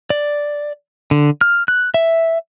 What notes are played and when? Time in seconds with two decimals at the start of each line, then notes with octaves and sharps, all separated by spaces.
0.10 D5
1.11 D3
1.41 F6
1.68 F#6
1.94 E5